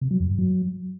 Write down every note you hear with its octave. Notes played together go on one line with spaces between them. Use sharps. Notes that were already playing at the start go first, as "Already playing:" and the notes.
C3
F#3
F2
G2
F#3